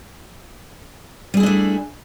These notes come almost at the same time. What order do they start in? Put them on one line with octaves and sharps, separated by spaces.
G3 G#4 E4 D4 A3